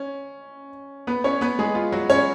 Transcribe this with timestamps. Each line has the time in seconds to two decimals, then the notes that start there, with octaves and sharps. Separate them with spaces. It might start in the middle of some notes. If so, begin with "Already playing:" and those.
Already playing: C#4
1.07 B3 B4
1.24 C#4 C#5
1.41 B3 B4
1.59 G#3 G#4
1.75 F4
1.92 F#3 F#4
2.10 C#4 C#5